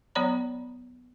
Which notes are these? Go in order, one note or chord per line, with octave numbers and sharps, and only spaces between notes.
F#3 B3 C#5 D5 A#5 B5